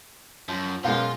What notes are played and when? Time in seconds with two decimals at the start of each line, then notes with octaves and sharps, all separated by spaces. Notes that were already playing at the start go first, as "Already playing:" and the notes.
0.48 F#2 F3
0.84 F#2 B2 G#3 F4 F5